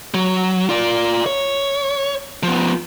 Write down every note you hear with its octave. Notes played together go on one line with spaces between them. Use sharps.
F#3
F4 D5
C#5
F3 B3